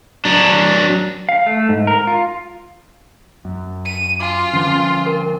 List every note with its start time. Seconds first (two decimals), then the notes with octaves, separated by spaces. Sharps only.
0.25 F#3 D4
1.29 F5
1.46 A3
1.69 G#2
1.87 A#4
2.07 F4
3.45 F#2
3.85 D#7
4.20 F4 G#5 D6
4.53 D3 F3 C#4
5.06 A#4